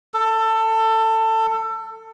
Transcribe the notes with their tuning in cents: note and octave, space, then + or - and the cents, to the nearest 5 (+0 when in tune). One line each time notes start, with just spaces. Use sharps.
A4 +20